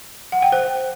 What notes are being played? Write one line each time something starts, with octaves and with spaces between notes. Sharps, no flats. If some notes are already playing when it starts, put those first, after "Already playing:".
F#5
G5
C5